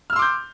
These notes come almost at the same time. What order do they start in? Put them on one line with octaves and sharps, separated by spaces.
F6 E6 C6 D6 G6